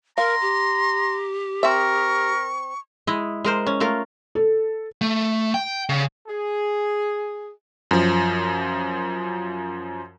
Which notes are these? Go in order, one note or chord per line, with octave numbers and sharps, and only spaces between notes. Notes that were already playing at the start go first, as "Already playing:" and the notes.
A#4 F5 A#5 C6
G4
C4 A#4 E5 C#6
G#3 E4 D#5
G#3 A#4 C5
C#4
A3 F4 A#4
A4
A3
G5
C#3
G#4
F#2 F3